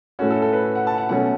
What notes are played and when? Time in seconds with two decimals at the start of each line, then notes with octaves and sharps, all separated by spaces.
0.19 A2 A3 C#4 F#4
0.30 A4
0.42 A4
0.53 B4
0.75 F#5
0.87 A5
0.98 F#5
1.09 B2 F#3 A3 C#4 F#5